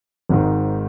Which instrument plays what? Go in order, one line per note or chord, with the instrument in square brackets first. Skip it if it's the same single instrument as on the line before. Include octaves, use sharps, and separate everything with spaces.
[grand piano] G#1 G#2 D#3